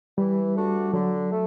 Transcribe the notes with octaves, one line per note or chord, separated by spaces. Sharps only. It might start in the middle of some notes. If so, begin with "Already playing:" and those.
E3 G3
A3 D4 F#4
D3 F#3
A3